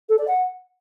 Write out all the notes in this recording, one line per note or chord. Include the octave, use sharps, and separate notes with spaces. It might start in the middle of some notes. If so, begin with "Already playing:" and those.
A4
D5
F#5